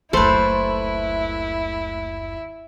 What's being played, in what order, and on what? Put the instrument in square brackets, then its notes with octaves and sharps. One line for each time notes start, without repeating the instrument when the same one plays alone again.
[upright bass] F#1 D2 [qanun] A3 C5 [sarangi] E4 [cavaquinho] A4 B4